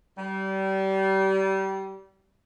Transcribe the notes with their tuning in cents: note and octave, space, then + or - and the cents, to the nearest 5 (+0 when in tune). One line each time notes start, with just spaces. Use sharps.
G3 -30